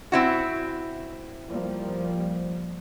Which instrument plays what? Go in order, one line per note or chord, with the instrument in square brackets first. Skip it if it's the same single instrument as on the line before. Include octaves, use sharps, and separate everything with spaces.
[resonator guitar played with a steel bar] C4 E4 F#4
[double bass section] F3 G3 A#3